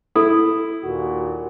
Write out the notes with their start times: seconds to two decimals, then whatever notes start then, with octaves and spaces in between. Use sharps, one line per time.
0.16 E4 A4
0.83 D#2 A#2 F#4